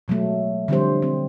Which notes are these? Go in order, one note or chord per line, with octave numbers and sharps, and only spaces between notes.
B2 F#3 G#3 A3
D3 F3 G3 C4 G4 C5
C4